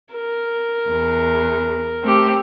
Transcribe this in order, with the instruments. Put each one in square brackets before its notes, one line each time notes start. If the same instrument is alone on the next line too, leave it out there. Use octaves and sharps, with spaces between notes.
[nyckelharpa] A#4
[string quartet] E2
A3 C4 G4